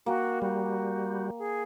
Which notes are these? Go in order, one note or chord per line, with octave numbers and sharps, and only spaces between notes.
A#3 F#4 G5
G3 F#4
G#4